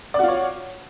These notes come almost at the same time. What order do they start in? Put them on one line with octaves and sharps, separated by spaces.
D5 F#4 F4 C#5